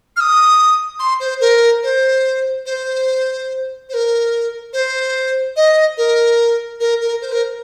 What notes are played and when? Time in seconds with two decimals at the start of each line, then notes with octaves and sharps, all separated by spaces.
0.16 F6
0.20 D#6
0.99 C6
1.20 C5
1.40 A#4
1.83 C5
2.66 C5
3.89 C5
3.94 A#4
4.73 C5
5.56 D#5
5.97 A#4
6.80 A#4
7.01 A#4
7.21 C5
7.32 A#4